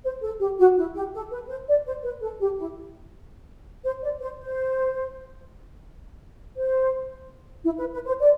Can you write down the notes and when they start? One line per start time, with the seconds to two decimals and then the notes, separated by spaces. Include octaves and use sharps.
0.04 C5
0.23 A4
0.40 G4
0.60 F#4
0.77 E4
0.95 G4
1.14 A4
1.31 B4
1.49 C5
1.68 D5
1.85 C5
2.04 B4
2.22 A4
2.41 G4
2.59 E4
3.84 C5
4.03 D5
4.21 C5
4.40 C5
6.57 C5
7.65 E4
7.78 B4
7.93 B4
8.06 C5
8.20 D5